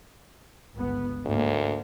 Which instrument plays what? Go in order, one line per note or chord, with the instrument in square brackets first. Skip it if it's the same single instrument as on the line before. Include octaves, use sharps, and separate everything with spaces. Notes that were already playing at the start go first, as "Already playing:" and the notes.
[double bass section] G1 C#2 B3
[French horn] D2 [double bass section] G#2 A#3